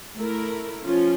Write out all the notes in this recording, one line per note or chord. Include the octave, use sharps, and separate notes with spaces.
A3 E4 A#4
F3 C#4 F4